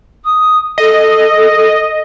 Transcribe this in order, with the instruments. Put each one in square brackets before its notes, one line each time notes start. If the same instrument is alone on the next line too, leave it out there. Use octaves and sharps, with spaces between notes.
[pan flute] D#6
[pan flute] A4 [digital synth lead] D#5